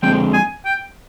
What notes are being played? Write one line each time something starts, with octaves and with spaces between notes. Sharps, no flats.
D3 F3 G#3 C4 G5
G#5
G5